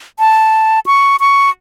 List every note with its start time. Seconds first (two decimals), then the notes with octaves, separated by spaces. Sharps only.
0.19 A5
0.86 C#6
1.20 C#6